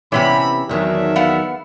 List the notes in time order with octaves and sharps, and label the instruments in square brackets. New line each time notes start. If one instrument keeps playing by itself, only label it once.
[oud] C3 B3 C#4 [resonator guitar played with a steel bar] E3 E4 G4 [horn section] B5
[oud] E2 D#3 F#3 [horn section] D4 E5
[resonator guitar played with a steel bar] B3 F5 F#5